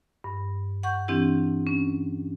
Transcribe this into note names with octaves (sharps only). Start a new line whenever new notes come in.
G2
F#5 C#6 G6
E3 C4 D4 E4 G4
C#4